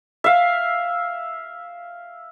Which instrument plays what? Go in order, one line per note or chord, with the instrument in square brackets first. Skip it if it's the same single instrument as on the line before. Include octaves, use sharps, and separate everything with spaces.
[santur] E5 F5